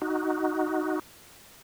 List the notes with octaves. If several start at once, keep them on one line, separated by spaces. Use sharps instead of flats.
D#4 F#4